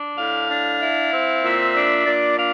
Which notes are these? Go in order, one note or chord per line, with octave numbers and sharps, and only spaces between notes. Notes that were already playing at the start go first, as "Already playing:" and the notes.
Already playing: D4
A2 F5
D4
E4
C4
A#2 E5
D4
A#2 D5
D4 F5